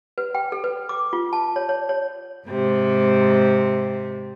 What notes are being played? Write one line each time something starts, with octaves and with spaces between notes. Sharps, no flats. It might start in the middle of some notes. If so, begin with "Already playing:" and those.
B4
G5
A4
B4
D6
F4
A5
C#5
C#5
C#5
G#2 C3